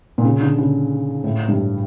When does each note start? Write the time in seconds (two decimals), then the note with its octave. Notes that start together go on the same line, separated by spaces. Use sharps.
0.18 A#2
0.25 C#3
0.41 D3
0.58 C#3
1.24 A2
1.48 G2